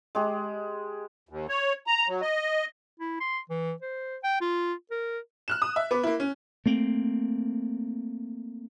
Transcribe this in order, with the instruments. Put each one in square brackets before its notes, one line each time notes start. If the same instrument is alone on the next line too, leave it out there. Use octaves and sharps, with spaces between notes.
[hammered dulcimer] G#3 G4
[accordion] D#2
C#5
A#5
F#3
D#5
[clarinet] E4
C6
E3
C5
G5
F4
A#4
[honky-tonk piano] F6 F#6 E7
D#6
E5
B3 B4 D6
A#3 E4
C#4
[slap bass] A3 A#3 C4